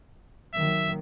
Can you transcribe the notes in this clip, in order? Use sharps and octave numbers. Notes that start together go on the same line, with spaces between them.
D#3 F#3 A#3 E5